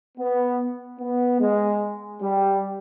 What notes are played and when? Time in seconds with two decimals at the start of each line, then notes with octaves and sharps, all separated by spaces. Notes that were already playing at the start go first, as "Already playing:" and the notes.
0.18 B3
1.00 B3
1.41 G#3
2.22 G3